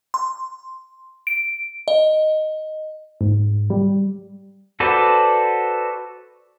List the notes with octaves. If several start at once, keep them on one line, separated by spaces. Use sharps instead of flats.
C6
D7
D#5
G#2
G3
F#4 A4 B4 C5 D5